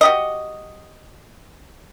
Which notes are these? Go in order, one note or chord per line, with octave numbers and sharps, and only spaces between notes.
F#4 G4 D#5